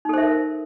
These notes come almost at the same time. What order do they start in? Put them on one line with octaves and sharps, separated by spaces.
D#4 A4 C5 E5 A#4